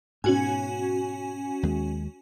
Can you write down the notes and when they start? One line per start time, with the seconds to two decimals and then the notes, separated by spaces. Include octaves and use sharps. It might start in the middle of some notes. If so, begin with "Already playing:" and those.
0.24 G#2 B2 C#4 F#4 G#5
1.63 D#2 G#3